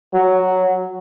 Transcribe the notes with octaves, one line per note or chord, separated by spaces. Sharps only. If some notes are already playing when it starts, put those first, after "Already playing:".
F#3